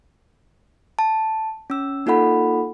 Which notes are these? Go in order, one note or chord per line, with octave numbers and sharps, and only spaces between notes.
A5
C#4 E6
A#3 D#4 F4 A4 F#5 B5